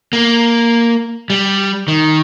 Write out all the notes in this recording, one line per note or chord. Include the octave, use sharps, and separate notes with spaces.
A#3
G3
D#3